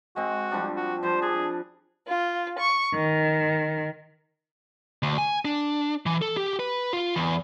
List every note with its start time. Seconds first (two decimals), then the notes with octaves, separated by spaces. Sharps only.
0.16 G#3 C4 F#4
0.51 F3 G3 D4
0.77 F#4
1.03 F3 G3 C5
1.22 D4 G#4
2.06 F4
2.59 C#6
2.94 D#3
5.03 D2
5.18 G#5
5.45 D4
6.06 E3
6.22 A4
6.37 G4
6.60 B4
6.93 F4
7.16 E2